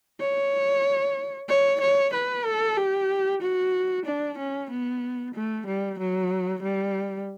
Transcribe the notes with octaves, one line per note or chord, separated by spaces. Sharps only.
C#5
C#5
C#5
B4
A4
G4
F#4
D4
C#4
B3
A3
G3
F#3
G3